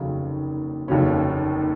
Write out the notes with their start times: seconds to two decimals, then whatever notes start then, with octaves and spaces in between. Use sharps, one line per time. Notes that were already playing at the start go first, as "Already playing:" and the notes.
Already playing: F1 D#2 C#3 F#3
0.88 F1 D#2 C#3 F#3 C#4